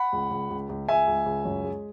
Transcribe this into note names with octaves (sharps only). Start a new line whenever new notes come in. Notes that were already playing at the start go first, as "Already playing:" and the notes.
Already playing: F#5 B5
C#2
C#2
C#2
C#2
C#2 E5 G#5
C#2
C#2
F#2
G#3